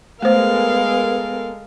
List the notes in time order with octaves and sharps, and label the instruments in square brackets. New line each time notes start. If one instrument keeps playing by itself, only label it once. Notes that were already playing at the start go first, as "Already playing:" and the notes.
[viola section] G#3 A4 A#4 [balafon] A3 C5 [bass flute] B3 [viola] F5